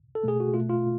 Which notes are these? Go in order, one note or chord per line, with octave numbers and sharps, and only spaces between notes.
A4
B2 A3 G#4
F#4
B2 A3 F4
F4